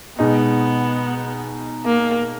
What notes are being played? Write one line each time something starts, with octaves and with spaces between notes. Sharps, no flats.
B2 G#3 B3 D#4
A#3